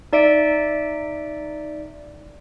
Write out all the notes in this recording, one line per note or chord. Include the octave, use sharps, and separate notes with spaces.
D#4 D5 E5 D7